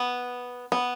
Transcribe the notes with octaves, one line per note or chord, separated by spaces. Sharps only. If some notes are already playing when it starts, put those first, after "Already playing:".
Already playing: B3
B3